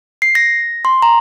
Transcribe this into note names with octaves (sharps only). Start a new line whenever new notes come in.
C7
A#6
C6
A#5